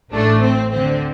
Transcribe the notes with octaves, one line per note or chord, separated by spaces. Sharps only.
A1 A2 A3 D4
C4
D2 D3 C4